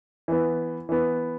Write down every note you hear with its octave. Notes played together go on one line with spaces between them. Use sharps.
E3 B3
E3 B3